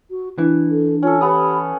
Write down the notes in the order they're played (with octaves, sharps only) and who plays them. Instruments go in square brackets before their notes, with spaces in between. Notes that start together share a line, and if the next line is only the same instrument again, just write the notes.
[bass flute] F#4
[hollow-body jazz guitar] E3 [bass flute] D4
[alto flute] A4
[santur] C#4 A4 [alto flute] F4
[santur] B3 D#6 [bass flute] G4 [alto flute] B5